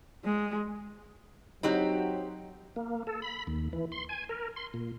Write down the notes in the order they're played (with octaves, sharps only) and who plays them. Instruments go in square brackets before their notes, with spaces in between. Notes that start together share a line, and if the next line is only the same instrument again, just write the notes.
[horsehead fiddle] G#3
[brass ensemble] F#3 [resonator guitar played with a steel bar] C4 F#4 G4 [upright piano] D#4
[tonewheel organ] A#3
A4
B5
D#2
E3
C6
G#5
A#4
C6
A#2